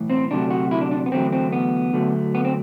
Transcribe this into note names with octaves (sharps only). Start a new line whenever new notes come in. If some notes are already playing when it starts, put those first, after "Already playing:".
Already playing: B1 A2 E3
C4
D2 C3 F#3 A3 D4
F#4
E4
D4
D4
B3
E2 D3 F#3 A3 C4
C4
B3
D2 D3 F#3 A3
B3
C4